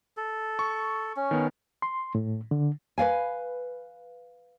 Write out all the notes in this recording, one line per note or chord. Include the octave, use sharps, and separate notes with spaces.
A4
C#6
C#4
D#3 B3
C6
A2
D3
B4 D5 F5 G#5